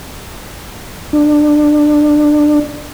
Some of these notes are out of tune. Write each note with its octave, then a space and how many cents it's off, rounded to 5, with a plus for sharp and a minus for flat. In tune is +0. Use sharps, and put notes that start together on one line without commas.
D4 +20